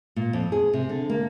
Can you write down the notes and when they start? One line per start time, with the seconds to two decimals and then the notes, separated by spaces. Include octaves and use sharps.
0.16 A#2
0.33 F2
0.52 G#4
0.73 C3
0.89 D3
1.09 A#3